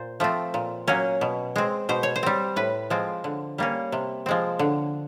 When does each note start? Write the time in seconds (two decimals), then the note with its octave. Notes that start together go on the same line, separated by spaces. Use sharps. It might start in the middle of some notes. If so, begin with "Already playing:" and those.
Already playing: A#2 C5
0.20 F3 A3 C4
0.54 A#2
0.88 F#3 A#3 C#4
1.21 B2
1.56 G#3 C4
1.89 B2 C5
2.03 C#5
2.16 C5
2.23 G3 C4
2.56 A2 B4
2.90 F3 G#3 C4
3.24 D3
3.58 G3 A#3 C#4
3.92 C3
4.26 F3 G#3 C4
4.59 D3